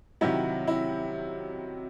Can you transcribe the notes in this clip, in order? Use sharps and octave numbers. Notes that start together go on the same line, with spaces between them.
C3 D#3 F#3 E4
E4